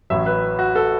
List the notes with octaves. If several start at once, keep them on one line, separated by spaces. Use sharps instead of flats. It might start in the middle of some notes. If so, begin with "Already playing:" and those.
A1 A2 F#3 E5
B4
F#4
A4